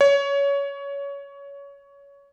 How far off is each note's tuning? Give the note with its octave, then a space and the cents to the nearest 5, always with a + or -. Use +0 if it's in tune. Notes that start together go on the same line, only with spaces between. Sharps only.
C#5 +20